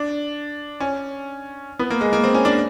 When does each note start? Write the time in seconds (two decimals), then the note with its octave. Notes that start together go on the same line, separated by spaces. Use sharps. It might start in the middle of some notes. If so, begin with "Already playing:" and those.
Already playing: D4
0.80 C#4
1.79 B3
1.90 A#3
2.01 G#3
2.13 A#3
2.24 C4
2.34 C#4
2.45 D4